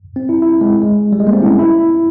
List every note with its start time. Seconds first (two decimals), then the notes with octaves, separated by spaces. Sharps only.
0.16 C4
0.29 E4
0.42 E4
0.61 G#3
0.82 G#3
1.13 G3
1.20 G#3
1.27 A#3
1.33 C4
1.42 E4
1.46 C#4
1.59 E4